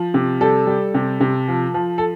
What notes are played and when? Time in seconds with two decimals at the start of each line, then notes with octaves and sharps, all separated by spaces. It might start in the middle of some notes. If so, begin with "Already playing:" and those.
Already playing: F3
0.14 C3
0.41 G3 A4
0.67 G3
0.94 C3
1.20 C3
1.48 F3
1.74 F3
1.98 A4